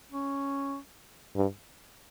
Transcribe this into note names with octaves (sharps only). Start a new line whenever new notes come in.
C#4
G2